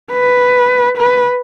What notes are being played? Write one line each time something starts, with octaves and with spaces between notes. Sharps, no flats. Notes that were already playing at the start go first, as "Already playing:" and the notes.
B4
B4